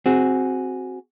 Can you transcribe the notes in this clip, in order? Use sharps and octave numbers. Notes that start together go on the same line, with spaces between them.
C4 F#4 G#4